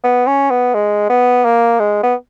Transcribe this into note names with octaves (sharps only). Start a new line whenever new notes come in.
B3
C#4
B3
G#3
B3
A#3
G#3
B3